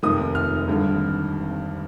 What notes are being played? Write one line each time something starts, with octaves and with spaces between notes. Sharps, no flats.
F1 D#2 D#3 D#6
F6
G#1 G2 D3